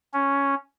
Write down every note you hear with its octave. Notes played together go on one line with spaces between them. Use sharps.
C#4